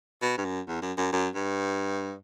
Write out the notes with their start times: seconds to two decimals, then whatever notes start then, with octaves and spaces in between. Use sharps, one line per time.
0.22 B2
0.38 G2
0.45 F#2
0.68 E2
0.82 F#2
0.98 F#2
1.13 F#2
1.35 G2